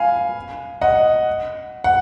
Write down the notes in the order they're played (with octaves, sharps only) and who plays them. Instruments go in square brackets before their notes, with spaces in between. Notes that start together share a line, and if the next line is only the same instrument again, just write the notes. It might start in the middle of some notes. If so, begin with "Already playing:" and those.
Already playing: [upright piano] F5 G#5 B5
D#5 F#5
F#5